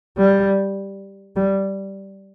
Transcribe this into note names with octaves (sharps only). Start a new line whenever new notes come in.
G3
G3